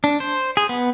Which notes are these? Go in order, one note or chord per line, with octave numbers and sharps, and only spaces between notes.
D4
C5
G#4
B3